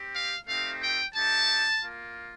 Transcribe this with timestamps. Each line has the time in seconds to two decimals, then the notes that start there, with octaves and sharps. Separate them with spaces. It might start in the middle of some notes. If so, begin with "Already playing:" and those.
Already playing: C4 G4
0.14 F5
0.48 A3 C4 D#4 G4 F5
0.81 G5
1.14 A3 D#4 G4 A5
1.81 A#3 F4